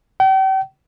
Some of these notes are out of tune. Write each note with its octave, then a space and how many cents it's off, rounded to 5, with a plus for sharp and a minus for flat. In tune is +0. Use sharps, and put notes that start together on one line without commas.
G5 -40